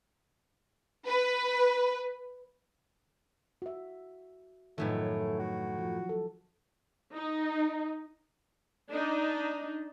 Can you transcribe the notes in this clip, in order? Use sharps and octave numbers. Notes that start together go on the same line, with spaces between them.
B4
F#4 E5
F#2 A2 D#3 F3 A3 B3 D#4
F#4
F3 F#3
A4
D#4
D4 D#4